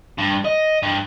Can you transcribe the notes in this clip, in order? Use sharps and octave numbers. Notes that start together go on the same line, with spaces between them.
G2
D#5
G2